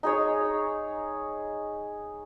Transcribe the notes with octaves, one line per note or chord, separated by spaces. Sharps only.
D#4 G#4 C#5